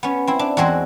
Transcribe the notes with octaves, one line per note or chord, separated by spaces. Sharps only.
B3 C#4
C4 E4
D4
E2 G#3 C4 F#4